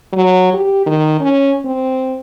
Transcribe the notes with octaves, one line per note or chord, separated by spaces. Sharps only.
F#3
G4
D#3
C#4
C4